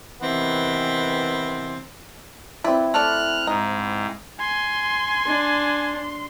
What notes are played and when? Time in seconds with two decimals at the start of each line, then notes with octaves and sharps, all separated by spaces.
0.21 C3 D#3 E3 B3 C4
2.64 C4 E4 B4 D5
2.94 A3 A4 D5 F6 F#6
3.47 G#2 D#4
4.40 G#5 C6
5.26 D4